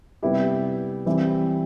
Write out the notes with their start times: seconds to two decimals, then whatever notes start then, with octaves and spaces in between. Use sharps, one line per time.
0.23 C3 G3 B3 E4 G4
1.06 E3 G3 C4 E4 G4